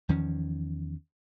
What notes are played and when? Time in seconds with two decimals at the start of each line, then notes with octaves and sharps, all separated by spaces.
0.09 E2 D#3 F3 C#4